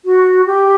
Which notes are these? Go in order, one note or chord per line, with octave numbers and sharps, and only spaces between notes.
F#4
G4